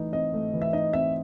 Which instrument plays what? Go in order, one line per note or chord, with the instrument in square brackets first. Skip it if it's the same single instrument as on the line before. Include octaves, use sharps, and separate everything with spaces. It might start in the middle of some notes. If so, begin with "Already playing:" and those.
Already playing: [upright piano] E3 A3 D#4
[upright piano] C4 [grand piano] D#5
[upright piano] A3
E3
[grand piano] E5
[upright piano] D#4 [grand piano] D#5
[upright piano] C4 [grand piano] E5